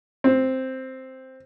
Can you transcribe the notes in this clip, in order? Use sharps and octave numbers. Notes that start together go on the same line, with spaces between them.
C4